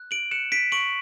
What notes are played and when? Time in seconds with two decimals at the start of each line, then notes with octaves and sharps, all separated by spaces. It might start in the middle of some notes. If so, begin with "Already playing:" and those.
Already playing: F#6
0.11 D7 F#7
0.31 F#6 C#7 E7
0.52 B6 D7
0.72 C#6 D7 F#7